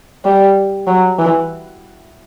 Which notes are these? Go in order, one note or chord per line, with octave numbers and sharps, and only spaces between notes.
G3
F#3
E3